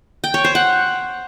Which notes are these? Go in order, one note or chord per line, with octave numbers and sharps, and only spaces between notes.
G5
C#5
C5
F#5